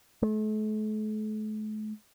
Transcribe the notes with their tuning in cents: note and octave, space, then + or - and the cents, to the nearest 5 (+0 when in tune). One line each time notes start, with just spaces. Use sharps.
A3 -40